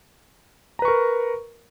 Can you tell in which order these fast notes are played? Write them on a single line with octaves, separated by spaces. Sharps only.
A#5 B4 C#6 A#4